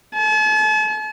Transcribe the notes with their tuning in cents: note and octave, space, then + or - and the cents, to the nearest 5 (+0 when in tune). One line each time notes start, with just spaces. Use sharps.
A5 -45